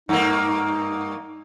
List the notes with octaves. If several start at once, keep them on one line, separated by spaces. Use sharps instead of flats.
G2 A#3 D#4